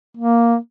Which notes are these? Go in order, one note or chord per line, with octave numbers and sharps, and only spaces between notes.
A#3